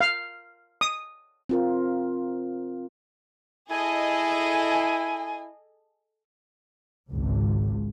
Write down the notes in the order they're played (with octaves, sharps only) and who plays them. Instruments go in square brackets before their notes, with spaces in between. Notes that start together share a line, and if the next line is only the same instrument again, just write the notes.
[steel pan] F5
D#6
[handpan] C4 F4 A#4
[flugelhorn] E4 [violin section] G#4 A4 D#5 [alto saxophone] G#5
[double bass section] G#1 C#2